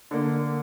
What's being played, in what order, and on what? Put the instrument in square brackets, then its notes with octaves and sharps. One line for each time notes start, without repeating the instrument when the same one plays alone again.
[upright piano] D3 A#3